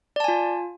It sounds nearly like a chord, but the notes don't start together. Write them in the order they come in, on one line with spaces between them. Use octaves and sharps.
D5 A5 G#5 F4